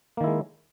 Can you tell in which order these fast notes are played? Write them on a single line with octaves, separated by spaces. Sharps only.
A#3 D#3 E4 G#3